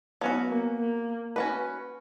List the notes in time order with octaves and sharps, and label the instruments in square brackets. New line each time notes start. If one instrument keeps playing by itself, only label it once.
[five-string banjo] F#3 C#4 F#4 [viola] B3
[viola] A#3
A#3
[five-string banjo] C#4 F#4 B4